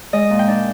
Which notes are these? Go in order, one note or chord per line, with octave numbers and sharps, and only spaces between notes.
G#3 D#5
A#2
G5
D4